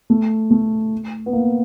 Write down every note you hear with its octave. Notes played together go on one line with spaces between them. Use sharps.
A3
A3
B3
A#3